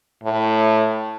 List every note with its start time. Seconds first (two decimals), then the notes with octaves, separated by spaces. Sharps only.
0.24 A2